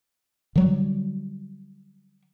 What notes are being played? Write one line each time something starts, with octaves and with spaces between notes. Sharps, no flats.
D3 F#3 G3